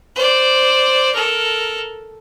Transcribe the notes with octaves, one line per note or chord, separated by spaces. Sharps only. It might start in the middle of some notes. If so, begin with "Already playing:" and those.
C5 D5
A4 A#4